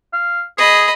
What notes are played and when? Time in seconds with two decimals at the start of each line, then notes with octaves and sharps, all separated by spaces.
0.13 F5
0.58 G#4 D#5 B5